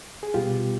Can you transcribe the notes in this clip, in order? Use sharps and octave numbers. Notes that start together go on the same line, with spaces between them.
G#4
C2 B2 G3 B3 F4 G4